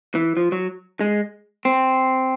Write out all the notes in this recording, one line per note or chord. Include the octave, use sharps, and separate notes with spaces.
E3
F3
F#3
G#3
C4